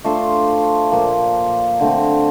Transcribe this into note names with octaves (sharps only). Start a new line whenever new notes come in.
A3 D4 F4 C5
A#2 F3 A#3
D3 A3 C4